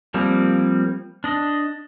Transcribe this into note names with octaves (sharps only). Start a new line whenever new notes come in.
F3 G3 A#3 C4
D4 D#5